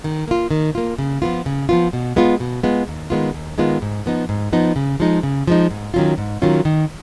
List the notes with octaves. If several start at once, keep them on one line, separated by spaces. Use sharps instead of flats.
D#3
A#3 F4
D#3
A#3 F4
C#3
F3 B3 F4
C#3
F3 B3 F4
B2
G#3 B3 F4
B2
G#3 B3 F4
D#2
D#3 G#3 B3 F4
D#2
D#3 G#3 B3 F4
G#2
F3 B3 D#4
G#2
F3 B3 D#4
C#3
F3 G#3 D#4
C#3
F3 G#3 D#4
G#2
D#3 F#3 C#4 F4
G#2
D#3 F#3 C#4 F4
D#3